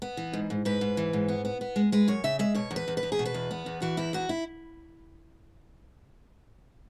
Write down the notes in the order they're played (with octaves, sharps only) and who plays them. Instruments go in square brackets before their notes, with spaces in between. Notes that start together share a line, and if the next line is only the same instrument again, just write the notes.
[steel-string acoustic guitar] B3
E3
G#2
G#2
G#2 B4
G#2
E3
G#2
B3
B3
B3
G#3
G#3 B4
F#2 C#5
C#3 E5
G#3 E5
B2 C#5
E2
B4
E2
B4
E2
G#4
B2
B4
E2
B3
E2
E3 F#4
E2 E4
E2 F#4
E4